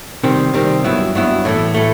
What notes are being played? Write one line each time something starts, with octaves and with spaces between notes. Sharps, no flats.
C3 D#3 G3 C4
C3 D#3 G3 C4
G2 F#3 B3 E4
G2 F#3 B3 E4
A2 E3 A3
A2 E3 A3